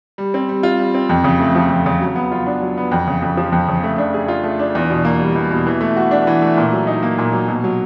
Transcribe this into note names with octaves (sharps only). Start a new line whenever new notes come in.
G3
C4
G3
F4
G3
C4
F2
C#3
A3
F3
F2
C#3
F#3
B3
F4
D4
F#3
B3
F2
C#3
F2
F3
F2
C#3
A3
D4
G#4
F4
A3
D4
E2
B2
A#3
G3
E2
B2
E3
A3
F#4
D4
E3
A3
A#2
F#3
D#4
A#3
A#2
F#3
B2
F#3